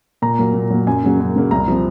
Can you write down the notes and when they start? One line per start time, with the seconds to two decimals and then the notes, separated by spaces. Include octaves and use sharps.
0.22 A#2 A#5
0.39 F#3 A#3
0.54 A#2
0.70 F#3 A#3
0.87 F#2 G#5
1.04 C#3 F#3 A#3
1.20 F#2
1.36 C#3 F#3 A#3
1.51 C2 A#5
1.68 C3 F3